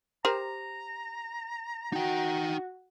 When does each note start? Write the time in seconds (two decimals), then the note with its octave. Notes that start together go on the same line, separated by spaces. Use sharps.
0.25 G4 A#4 C5 A#5
1.93 D#4 F#4 G5